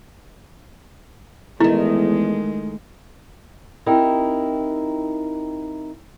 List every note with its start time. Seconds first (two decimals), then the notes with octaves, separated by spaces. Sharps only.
1.60 E2 D#3 G#3 A3 E4
3.86 C4 D#4 E4 G4 A#4